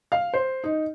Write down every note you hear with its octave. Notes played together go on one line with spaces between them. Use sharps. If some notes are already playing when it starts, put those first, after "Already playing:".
F5
C5
D#4